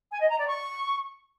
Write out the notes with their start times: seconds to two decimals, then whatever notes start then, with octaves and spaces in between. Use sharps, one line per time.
0.12 G#5
0.21 D#5
0.30 A#5
0.39 D5
0.48 C#6